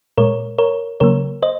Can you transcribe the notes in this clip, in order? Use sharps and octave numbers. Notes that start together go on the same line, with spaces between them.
A#2 G#3 A#4 C#5
A#4 C#5
C#3 F#3 A#3 A#4 C#5
C5 D#5